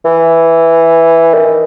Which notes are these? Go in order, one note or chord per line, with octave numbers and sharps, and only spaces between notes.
E3
D#3